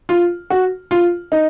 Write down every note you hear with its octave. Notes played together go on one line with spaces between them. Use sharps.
F4
F#4
F4
D#4